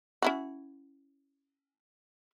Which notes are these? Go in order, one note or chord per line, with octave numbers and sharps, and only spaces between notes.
C#4 E4 F#4